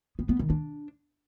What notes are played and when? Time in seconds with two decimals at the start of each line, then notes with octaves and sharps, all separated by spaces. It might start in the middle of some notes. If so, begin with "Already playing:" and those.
0.19 B3
0.29 B3
0.39 D#3
0.50 D4